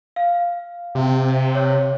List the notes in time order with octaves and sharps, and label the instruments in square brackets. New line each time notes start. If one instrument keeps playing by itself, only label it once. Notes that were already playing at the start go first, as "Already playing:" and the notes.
[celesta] F5
[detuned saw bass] C3
[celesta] C#5